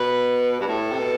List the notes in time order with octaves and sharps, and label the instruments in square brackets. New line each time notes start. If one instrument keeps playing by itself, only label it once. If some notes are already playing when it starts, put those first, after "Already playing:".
Already playing: [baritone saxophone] B2 [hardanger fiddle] B4
[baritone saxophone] G2
[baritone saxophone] A2 [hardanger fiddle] A4
[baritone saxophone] C3
B2